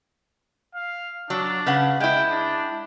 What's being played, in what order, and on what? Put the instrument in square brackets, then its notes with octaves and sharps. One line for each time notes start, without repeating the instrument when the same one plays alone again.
[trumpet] F5
[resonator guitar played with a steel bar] F#3 [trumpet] D4
[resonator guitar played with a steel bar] C#3 B4 F#5
[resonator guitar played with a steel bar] G#3 E4 [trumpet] G5
[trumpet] D4